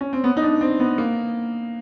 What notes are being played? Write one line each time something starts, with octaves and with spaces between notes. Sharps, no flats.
C#4
C4
B3
D#4
D4
C4
B3
A#3